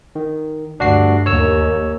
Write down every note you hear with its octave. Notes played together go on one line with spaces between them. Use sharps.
D#3
D2 G2 D4 F#4 C7
D#2 C#5 E6